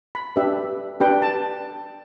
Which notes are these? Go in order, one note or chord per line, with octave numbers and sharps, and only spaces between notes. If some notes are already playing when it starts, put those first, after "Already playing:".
B5
D4 G4 B4 E5
D4 G4 B4 G5
A5